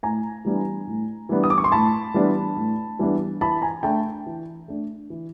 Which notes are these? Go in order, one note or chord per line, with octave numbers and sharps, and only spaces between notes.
A2 G#5 A#5
E3 G3 B3 D4
A2
E3 G3 B3 D4
D#6
D6
C#6
C6
A2 A5 B5
E3 G3 B3 D4
A2
E3 G3 B3 D4
E3 A5 B5
G#5 A#5
A3 D4 G5 A5
E3
A3 D4
E3